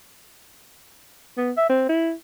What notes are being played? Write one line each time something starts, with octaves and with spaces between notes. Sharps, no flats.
B3
E5
C4
E4